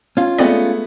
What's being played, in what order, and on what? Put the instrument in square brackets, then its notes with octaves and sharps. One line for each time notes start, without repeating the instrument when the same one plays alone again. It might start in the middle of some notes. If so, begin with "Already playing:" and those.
[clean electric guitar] C#4 F4
[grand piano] G#3 A3 B3 [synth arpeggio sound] C4 D5 D#5